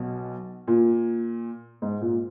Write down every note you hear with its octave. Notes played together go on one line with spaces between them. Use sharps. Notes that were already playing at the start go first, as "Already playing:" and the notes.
Already playing: B1 B2
A#2
G#2
A#2